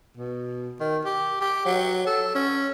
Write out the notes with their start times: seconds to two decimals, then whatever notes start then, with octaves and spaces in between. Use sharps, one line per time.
0.17 B2
0.81 D#3
1.05 G4
1.41 G4
1.66 F#3
2.07 A4
2.35 C#4